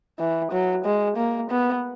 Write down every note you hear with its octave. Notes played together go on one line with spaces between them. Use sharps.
E3
F#3
G#3
A#3
B3